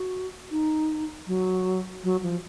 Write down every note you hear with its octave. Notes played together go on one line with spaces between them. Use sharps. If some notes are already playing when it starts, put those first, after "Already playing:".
Already playing: F#4
D#4
F#3
F#3
F3